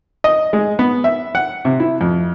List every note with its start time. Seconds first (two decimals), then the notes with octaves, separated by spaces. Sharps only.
0.24 D#5
0.53 G#3
0.79 B3
1.04 E5
1.35 F#5
1.65 C3
1.80 E4
2.01 F2